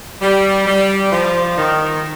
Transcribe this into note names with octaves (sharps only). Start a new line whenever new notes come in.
G3
G3
F3
D#3